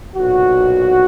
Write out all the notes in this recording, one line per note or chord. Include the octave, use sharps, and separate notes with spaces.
B1 A#2 F#4